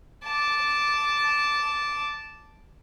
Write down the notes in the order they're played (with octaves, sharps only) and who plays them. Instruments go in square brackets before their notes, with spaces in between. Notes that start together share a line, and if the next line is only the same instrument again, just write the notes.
[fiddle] A5 D6